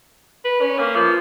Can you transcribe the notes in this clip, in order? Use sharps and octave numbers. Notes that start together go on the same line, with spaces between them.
B4
C#4
A#3
F3